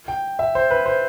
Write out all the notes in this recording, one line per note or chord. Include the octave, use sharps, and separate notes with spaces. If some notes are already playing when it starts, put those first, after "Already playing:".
G5
E5
C5
B4
C5